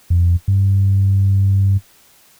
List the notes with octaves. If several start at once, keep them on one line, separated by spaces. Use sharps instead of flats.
F2
G2